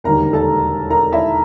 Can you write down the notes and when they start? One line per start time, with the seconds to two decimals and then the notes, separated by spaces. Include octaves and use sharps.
0.04 E1 D#2 D3 G3 A#4 A#5
0.33 A4 A5
0.90 A#4 A#5
1.12 E4 E5